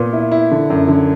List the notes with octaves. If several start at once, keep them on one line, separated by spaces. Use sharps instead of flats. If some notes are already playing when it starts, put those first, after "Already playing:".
Already playing: A#2 B3
E4
E4
D3
F#2
D3